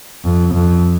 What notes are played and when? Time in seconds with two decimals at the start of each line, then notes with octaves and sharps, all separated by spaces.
0.24 F2
0.54 F2